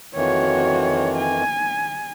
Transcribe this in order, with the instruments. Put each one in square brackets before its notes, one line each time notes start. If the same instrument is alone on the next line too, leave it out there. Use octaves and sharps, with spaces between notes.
[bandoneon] F2 D#3 E3 [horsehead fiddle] F#4 C#5
[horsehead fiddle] G#5